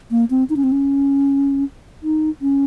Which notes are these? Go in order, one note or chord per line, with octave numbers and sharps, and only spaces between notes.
A#3
C4
D#4
C#4
C4
C#4
D#4
C#4